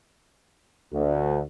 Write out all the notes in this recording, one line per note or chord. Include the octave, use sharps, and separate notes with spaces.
D2